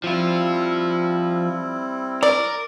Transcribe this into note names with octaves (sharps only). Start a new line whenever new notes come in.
F3 G3 C4 E4 F4
A#4 D5